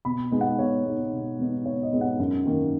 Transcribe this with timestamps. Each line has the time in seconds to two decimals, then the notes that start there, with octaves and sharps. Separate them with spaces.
0.05 B2 B5
0.31 G#3 B3 D#4
0.41 F#5
0.59 B2 C#5
0.85 G#3 B3 D#4
1.13 B2
1.39 G#3 B3 D#4
1.66 B2 C#5
1.83 D#5
1.93 G#3 B3 D#4
2.01 F#5
2.19 F#2
2.46 D#3 A#3